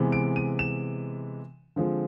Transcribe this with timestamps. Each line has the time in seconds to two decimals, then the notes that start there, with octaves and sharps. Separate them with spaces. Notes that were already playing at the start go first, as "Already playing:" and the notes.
Already playing: C3 E3 G#3 B3
0.12 D7
0.36 D#7
0.59 E7
1.76 D3 F3 G#3 C4